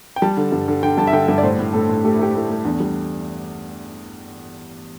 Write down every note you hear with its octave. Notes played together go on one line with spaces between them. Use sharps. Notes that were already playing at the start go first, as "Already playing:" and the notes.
G5
G3 A5
D3
G2
D3
D3 G5
G2 A5
E5
D3 G5
G2 E5
D5
A2 C5
A2
A2 A4
A2
A3 G4
E4
A3 G4
A3 E4
A3
E2 D4
G3